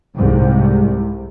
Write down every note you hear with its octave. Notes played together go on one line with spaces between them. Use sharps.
C2 G#2 C3 G3